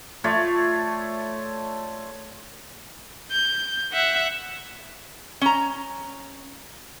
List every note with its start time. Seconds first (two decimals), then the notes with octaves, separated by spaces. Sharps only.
0.24 A3 F4 C#5 D5
3.31 G6
3.93 E5 F#5
5.41 C#4 A#5